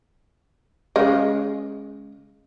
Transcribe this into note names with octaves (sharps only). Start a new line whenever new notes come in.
C#3 G#3